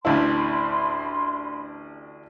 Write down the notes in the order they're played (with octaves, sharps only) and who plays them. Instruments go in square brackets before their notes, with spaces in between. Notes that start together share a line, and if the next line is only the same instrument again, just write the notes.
[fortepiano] A1 D2 E4 [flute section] B5 C6